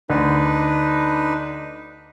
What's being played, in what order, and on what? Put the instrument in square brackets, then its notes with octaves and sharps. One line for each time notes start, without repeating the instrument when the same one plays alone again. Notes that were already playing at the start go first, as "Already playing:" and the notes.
[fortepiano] D2 [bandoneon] D4 D#4 B4